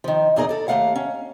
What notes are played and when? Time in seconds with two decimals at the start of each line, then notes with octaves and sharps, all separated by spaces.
0.04 D#3 F3
0.36 E2 A#2 D#4 G#4 A#4 D#5
0.49 A4 D5
0.68 D#2 G#3 A3 F5 F#5
0.96 C#4